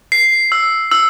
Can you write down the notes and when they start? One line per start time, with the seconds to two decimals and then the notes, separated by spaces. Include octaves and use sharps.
0.12 C7
0.52 E6
0.91 E6